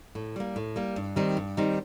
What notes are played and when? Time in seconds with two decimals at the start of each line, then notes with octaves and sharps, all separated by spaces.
0.15 A2
0.36 G3 A#3
0.56 A2
0.76 G3 A#3
0.96 G2
1.16 D#3 G3 C4 D#4
1.37 G2
1.57 D#3 G3 C4 D#4